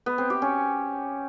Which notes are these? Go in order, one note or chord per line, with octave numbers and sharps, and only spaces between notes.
B3
C4
G4
C#4